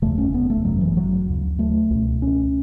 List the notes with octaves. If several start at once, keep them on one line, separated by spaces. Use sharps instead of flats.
F#1 E2 C#3 A3
C#4
B3
A3
G#1 F#2 C#3 F#3
E3
F#3
D2 C#3
A3
C#2 B2
C#4